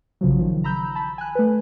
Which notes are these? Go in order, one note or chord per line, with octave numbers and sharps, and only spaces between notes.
A#1 C#3 F3 F#3
D#3 F3
A#5 B5 E6 G6
A5 B5
G#5 F#6
A3 B4